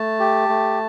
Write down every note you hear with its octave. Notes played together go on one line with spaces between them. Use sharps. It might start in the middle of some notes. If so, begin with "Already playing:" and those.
Already playing: A3 A5
G4
A3